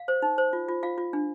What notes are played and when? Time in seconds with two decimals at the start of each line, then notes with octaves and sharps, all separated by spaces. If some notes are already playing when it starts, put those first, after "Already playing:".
Already playing: F5
0.08 C5
0.22 D#4
0.38 C5
0.53 F4
0.69 F4
0.83 F4 F5
0.98 F4
1.13 D4